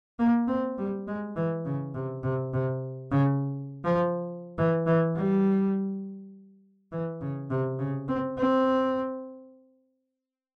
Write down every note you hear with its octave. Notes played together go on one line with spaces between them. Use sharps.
A#3
C4
G3
G#3
E3
C#3
C3
C3
C3
C#3
F3
E3
E3
G3
E3
C#3
C3
C#3
C4
C4